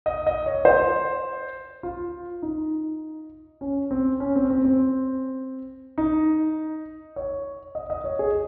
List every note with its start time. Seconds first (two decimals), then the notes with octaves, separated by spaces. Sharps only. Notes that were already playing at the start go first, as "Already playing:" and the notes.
0.06 D#5
0.27 D#5
0.46 C#5
0.65 C5
1.83 F4
2.42 D#4
3.61 C#4
3.91 C4
4.20 C#4
4.36 C4
4.50 C4
4.65 C4
5.98 D#4
7.16 C#5
7.75 D#5
7.90 D#5
8.04 C#5
8.19 G#4